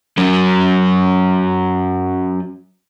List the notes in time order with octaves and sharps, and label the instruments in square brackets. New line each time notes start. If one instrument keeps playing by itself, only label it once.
[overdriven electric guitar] F#3 C#4